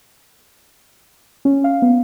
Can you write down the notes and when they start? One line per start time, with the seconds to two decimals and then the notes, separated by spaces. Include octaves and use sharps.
1.45 C#4
1.64 F5
1.82 B3